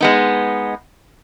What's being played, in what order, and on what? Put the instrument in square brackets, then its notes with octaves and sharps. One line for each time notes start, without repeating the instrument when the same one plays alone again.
[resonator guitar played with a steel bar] G#3 B3 D#4